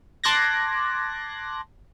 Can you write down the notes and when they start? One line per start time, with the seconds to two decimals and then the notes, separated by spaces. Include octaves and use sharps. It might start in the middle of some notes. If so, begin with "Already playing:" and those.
0.24 A5 C6 D6 F#6 G#6 A#6